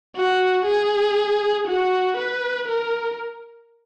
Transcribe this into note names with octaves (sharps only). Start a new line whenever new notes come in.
F#4
G#4
F#4
B4
A#4